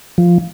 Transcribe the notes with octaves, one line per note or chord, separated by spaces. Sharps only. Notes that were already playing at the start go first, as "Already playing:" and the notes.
F3